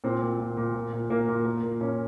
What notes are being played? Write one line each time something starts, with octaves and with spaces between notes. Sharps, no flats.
A#2 C4
A#2
A#2
A#2
A#2
A#2
A#2 A#3
A#2
A#2 A#3
A#2
A#2 C#4